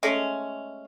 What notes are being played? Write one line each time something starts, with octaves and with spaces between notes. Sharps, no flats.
G#3 A3 C#4